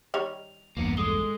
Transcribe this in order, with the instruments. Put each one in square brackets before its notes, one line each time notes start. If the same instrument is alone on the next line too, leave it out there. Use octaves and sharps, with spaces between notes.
[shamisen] D#3 G3 C#5 [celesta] F7
[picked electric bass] A#1 E2 G2 [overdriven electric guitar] A#3 B3
[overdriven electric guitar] G#3 [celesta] A4 D#6 G7